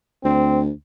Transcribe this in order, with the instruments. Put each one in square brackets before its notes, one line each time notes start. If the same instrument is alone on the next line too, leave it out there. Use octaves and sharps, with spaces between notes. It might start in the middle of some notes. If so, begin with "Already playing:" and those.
[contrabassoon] D2 [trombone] C4